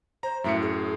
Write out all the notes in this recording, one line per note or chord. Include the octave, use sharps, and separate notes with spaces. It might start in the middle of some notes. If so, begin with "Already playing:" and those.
C5 A#5
F#2 A2 E5 C#7
G#4